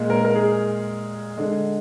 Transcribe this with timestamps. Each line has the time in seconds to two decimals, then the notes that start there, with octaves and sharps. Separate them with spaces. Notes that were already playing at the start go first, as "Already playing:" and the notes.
Already playing: A#2 G#3
0.10 A#4
0.25 A#4
0.36 G#4
1.37 D3 G#3